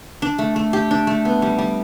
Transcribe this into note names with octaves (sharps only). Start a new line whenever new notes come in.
D4
A3
A3
G4
D4
A3
B3
G3
G3